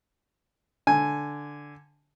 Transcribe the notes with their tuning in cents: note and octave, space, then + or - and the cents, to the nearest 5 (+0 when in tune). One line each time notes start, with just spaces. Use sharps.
D3 -5 G#5 +0